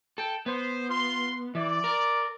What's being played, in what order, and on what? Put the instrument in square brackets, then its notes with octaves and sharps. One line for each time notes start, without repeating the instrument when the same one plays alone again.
[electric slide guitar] A4 [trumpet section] G5
[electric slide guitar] B3 [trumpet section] C5
[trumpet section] F4 C6
[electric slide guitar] E3 [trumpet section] D5
[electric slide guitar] A#4